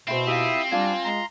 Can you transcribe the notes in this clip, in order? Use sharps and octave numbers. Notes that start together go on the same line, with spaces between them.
B2 C4 E4 C5
E4 F4 G4 E5 D#6
G3 D4 F4 G#5
G#3 A#5 C6